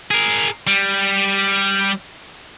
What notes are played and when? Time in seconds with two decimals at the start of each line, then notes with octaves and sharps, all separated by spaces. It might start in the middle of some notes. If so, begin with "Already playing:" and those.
0.11 G#4 A#4
0.67 G3